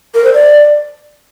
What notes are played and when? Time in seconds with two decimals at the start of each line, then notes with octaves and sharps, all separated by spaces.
0.14 A#4
0.24 C5
0.33 D5